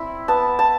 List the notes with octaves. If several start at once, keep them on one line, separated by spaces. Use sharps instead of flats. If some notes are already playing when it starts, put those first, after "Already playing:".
Already playing: C4 E4 B5
B3 A5
A5